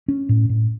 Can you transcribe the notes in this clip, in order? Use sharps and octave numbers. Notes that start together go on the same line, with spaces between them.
C#4
A2
A2